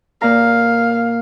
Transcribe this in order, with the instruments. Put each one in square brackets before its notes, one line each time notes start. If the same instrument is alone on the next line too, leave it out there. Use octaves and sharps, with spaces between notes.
[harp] A#2 A#4 A#5 [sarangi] F5